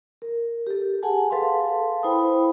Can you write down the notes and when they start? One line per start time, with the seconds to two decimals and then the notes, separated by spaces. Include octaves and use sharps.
0.22 A#4
0.67 G4 A4
1.03 G#4 F#5 G#5 A5
1.30 A4 B4 F5 A5 C6
2.03 E4 C5 G5 B5 D#6